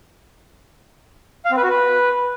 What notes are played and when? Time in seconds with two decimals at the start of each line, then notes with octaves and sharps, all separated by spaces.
1.45 F5
1.51 C4
1.57 B4
1.64 F#4
1.70 B4